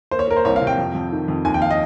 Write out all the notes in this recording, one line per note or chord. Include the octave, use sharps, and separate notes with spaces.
A#3 C5
C#5
A#3 A#4
C5
C2 C#5
F5
C3
G5
F2
F2
D#3
F2
D#2 G#5
G5
F5
D#5